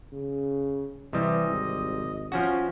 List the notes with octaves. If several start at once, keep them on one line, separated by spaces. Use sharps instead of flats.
C#3
C3 E3 G3 D#5
G#1
F3 C#4 F#4